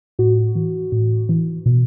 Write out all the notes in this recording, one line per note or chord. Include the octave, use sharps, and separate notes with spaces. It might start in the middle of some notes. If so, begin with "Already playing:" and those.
A2 F#4
E3
A2
E3
B2